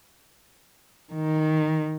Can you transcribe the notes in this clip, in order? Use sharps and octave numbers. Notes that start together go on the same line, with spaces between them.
D#3